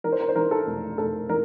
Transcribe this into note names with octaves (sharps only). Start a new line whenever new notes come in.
E3 A#4
C5
A#4
C5
E3 A#4
A4
F1
F1 A4
E3 A#4